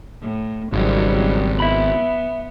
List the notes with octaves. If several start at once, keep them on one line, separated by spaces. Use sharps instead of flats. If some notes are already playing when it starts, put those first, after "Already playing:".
A2
G#1 C#3 F#3 G3
B3 E5 B5